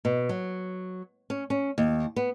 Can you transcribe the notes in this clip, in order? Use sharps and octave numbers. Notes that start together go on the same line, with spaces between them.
B2
F#3
C#4
C#4
D#2
B3